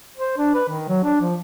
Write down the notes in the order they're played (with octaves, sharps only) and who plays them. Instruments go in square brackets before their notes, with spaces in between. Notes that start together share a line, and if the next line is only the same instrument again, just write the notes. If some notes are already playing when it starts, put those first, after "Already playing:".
[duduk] C5
D4
B4
D#3
F#3
D4
F3